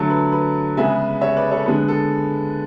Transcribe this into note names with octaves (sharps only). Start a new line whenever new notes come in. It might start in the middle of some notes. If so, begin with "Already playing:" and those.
Already playing: D3 F#3 A3 A4
B4
B4
C#3 G#3 B3 E5 G#5
C#5 E5
B4 D5
A4 C#5
D3 G#3 B3 B4
A4